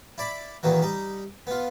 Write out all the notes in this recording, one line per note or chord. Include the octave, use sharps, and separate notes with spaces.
E4 D5 B5
E2 A#2 D#3 E3 F#3
G3 D#4
B3 F4